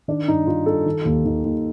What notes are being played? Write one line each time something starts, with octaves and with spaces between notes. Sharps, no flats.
D#3 D4
G2 D#4
D#3 F4
G2 A4
D#3
D#2
D#3
D#2